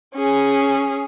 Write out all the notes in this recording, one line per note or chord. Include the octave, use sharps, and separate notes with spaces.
C#4 G#4